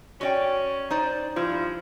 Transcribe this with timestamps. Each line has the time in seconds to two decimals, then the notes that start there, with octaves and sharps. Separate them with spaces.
0.21 C#4 F#4 D5 G5
0.90 D#4 C5 D5
1.36 G2 F3 E4